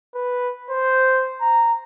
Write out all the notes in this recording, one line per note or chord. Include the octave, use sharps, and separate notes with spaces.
B4
C5
A#5